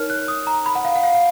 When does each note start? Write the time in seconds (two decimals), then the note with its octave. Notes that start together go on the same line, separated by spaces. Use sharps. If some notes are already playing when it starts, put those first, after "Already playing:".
Already playing: D#4 A#4 C#5 F6
0.10 F#6
0.28 D#6
0.47 A#5
0.66 B5
0.75 F#5
0.85 F5
0.95 F#5
1.03 F5
1.14 F5